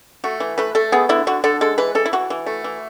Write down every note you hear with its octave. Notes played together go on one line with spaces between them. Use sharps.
A3 F#4
E3
A3 B4
A3 A4
B3 G#4
D3 E4
D3 F#4
D3 A4
G#3 A4
E3 B4
E3 A4
E4
E3 F#4
E3
A3
E3